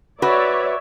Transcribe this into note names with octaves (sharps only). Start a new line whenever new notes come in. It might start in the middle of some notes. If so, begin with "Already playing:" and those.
F#4 B4 C#5 D5 E5